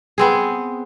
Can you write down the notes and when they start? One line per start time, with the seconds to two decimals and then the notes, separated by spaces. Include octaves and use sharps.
0.18 B3 C4 G#4